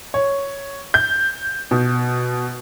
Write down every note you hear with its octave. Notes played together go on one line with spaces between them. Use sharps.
C#5
G6
B2